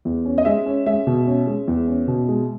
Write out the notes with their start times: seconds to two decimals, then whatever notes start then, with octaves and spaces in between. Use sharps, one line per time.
0.05 E2
0.25 C#4
0.38 D#5
0.45 G#3 E5
0.66 C#4
0.86 G#3 E5
1.07 B2
1.26 C#4
1.47 G#3
1.68 E2
1.87 C#4
2.08 B2
2.29 G#3